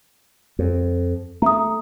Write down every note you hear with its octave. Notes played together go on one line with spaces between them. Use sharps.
F2
A3 A#5 D#6